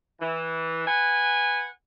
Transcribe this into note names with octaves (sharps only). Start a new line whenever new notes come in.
E3
B4 F#5 G#5